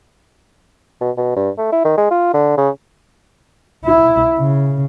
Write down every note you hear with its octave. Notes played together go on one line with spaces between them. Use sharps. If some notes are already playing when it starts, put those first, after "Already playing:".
B2
B2
G2
A3
E4
D#3
G#3
F4
D3
C#3
E4
C#3